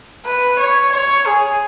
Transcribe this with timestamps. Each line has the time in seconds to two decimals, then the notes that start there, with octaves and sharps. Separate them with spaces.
0.25 B4
0.59 C#5
0.92 C#5
1.25 G#4